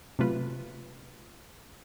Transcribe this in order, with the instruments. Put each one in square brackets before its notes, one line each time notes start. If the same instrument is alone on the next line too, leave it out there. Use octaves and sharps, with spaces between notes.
[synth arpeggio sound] C3 F#3 A3 F4 B4